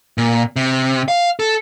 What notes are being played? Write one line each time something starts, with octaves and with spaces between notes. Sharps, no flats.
A#2
C3
F5
A4